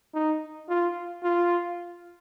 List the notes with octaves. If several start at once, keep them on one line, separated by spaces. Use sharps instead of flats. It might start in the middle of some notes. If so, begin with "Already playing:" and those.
D#4
F4
F4